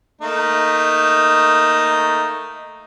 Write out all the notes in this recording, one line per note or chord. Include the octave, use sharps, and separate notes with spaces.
A3 A#3 D#4